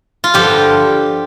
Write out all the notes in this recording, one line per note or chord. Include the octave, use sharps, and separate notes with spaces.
F4
G2 D3 F3 G4